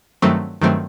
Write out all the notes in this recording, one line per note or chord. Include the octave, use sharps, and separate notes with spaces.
G2 D#3 F#3 A3 C4
G2 D#3 F#3 A3 C4